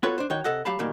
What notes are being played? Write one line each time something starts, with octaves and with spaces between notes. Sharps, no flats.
B3 F4 F#4 A4 B4 C#5
D4 C5
D#3 D#4 F#4 C#5 G5
C3 A4 D#5 F#5
F#3 G4 F5 A5 B5
D2 G2 A#2 D#3 G3 A#3